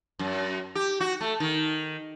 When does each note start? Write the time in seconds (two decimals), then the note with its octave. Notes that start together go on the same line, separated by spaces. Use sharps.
0.19 F#2
0.75 G4
1.00 F#4
1.21 A3
1.40 D#3